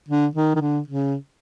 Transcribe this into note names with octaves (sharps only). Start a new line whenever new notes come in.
D3
D#3
D#3
D3
C#3